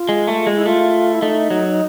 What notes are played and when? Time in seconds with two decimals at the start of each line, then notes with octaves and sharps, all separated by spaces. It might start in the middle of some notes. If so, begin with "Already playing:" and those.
Already playing: F4
0.09 G#3
0.28 A3
0.47 G#3
0.57 E4
0.66 A3 F4
1.15 E4
1.22 A3 D#4
1.51 F#3